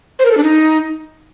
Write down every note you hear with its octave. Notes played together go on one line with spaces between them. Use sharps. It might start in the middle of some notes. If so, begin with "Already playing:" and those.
C5
A#4
A4
D4
D#4